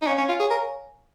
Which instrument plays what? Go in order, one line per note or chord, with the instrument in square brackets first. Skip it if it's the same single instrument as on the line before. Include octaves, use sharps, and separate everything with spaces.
[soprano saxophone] D#4
[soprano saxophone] C#4 [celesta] C#5 F5 G#5
[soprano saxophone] C#4
F4
[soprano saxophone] G#4 [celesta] C#5 F5 G#5 C#6
[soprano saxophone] A#4